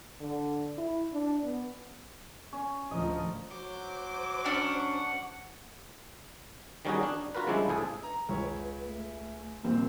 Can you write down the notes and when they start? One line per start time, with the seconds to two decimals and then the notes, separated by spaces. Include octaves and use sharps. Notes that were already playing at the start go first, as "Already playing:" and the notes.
0.20 D3
0.78 E4
1.13 D4
1.44 B3
2.53 C#4
2.91 A1 D2 F3 A#4 D#5
3.50 F#3 C5 D6
4.46 C#4 D4 F#5
6.85 D#3 G3 C#4 D#4 F#4 G#4
7.03 D4
7.35 F4 F#4 A#4 B4
7.47 C#3 F3 G3 G#3 D4 E4
7.68 C#2 A2 G#4 A4
8.03 B4 A#5
8.29 C#2 C#5
8.85 A3
9.63 D#1 A#1 A#3 C4